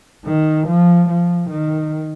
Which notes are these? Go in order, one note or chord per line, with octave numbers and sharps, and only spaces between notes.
D#3
F3
F3
D#3